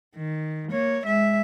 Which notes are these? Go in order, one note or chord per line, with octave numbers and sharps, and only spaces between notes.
D#3
A#3 C#5
G#3 E5